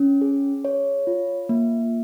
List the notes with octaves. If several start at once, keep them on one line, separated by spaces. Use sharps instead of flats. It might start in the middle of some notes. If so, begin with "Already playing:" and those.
Already playing: C#4
G#4
C#5
F4
A#3